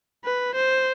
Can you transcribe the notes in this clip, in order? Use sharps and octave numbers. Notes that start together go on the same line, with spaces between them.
B4
C5